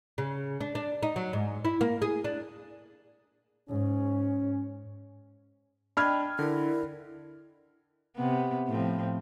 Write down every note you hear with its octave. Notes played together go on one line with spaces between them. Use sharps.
C#3
D4
D4
D#4
F#3
G#2
E4
A#3
G#4
D4
G#2 C#4
D4 D5 D#5 G5 B5 F6 G#6
D3 E4 A#4 D5
C3 B3
A2 F3 C4